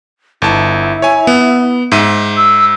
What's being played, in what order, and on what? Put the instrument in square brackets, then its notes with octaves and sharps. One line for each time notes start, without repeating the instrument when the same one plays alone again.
[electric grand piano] G1 A5 [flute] E4
[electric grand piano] C#5 G#5
B3
G#2 E5 D#7
[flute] E6